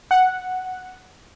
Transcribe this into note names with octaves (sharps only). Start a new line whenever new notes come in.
F#5